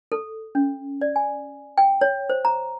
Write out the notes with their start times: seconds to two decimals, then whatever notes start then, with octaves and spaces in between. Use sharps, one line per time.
0.12 A4
0.55 C#4
1.01 D5
1.16 G#5
1.78 G5
2.01 C#5
2.30 C5
2.45 A#5